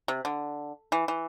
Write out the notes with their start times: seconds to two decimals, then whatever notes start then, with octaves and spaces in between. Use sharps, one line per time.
0.08 C3
0.25 D3
0.92 E3
1.08 E3